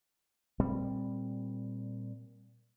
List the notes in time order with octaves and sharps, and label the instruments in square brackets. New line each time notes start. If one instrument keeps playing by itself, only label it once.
[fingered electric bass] A#2 G3 C4